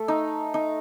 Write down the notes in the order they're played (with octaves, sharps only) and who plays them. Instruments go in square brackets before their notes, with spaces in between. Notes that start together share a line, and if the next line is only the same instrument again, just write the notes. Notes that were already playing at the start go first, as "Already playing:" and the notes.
Already playing: [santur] A3
D#4
D#4